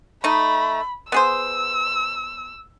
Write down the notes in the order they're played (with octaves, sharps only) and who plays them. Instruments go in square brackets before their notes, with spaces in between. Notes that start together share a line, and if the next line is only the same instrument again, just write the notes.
[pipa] A3 D#4 [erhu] B5
[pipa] B3 G#4 C5 [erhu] E6